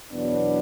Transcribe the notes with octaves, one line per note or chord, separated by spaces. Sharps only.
E2 B2 F#3 B3 D4